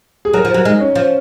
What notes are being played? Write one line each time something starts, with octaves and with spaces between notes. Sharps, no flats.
G#4
F#3 A#4
F3
F#3 A#4
G#3 D#4
C#4
F3